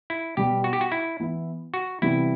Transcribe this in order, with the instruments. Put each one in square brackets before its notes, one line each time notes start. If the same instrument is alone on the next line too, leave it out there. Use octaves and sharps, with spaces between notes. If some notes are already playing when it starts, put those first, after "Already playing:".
[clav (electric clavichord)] E4
[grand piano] B2 G3 B3 [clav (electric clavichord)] G4
[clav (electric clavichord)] F#4
G4
F#4
E4
[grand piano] E3 B3 E4
[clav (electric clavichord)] F#4
[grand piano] C3 E3 G3 B3 [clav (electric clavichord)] E4